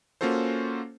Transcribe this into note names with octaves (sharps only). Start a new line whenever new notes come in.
A#3 C#4 F4 F#4 A4 C5